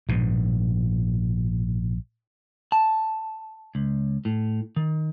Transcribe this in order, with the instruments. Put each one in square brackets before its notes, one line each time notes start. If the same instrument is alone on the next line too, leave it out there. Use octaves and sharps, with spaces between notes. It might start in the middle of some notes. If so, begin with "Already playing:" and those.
[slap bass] A#1 G#2 B2
[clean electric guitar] A5
C#2
A2
D#3